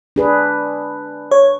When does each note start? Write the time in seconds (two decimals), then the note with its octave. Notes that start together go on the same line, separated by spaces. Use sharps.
0.16 D4 G#4 B4
1.31 C#5